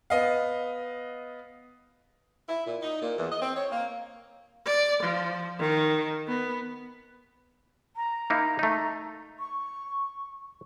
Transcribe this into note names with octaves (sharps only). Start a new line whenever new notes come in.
B3 D#5 F5
E4
A#2
D#4
A#2
E2
D#5
C4
C#5
A#3
D5
F3
D#3
B3
A#5
A#3 D#4 E4
A3 D#4
C#6